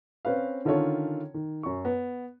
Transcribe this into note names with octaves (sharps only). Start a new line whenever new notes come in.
C4 C#4 B4 F5
D3 D#3 C#4 F4 A4 C#5
D#3
F#2 C#6
B3